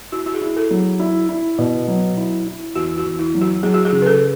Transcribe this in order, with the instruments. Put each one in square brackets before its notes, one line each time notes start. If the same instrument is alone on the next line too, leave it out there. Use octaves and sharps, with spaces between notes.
[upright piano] E4 [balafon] F#4
[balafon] F#4
G#4
[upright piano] E4
[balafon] A4
[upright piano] F#3
[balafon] G#4
[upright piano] E4
E4
B2
F#3
E4
E4
[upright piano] E2 [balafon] F#4
[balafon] F#4
[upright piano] E2
[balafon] E4
[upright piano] F#3
[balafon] F#4
[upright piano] F#3 [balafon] G#4
[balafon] F#4
G#4
[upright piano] C#3
[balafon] B4
A4